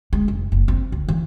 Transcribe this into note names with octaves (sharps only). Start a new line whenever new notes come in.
G#3
F1
F#1
C4
D2
E3